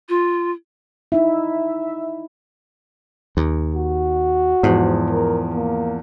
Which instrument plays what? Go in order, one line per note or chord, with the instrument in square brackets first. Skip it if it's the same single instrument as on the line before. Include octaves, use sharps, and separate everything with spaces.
[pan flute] F4
[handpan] D#4 E4 [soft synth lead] E5
[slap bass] D#2
[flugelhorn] F#4
[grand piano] E2 F3 [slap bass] G#2
[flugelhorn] A#4
A#3